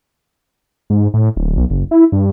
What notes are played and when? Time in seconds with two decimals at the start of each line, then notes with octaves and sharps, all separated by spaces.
0.90 G#2
1.14 A2
1.36 D1
1.57 B1
1.70 F#1
1.91 E4
2.12 G2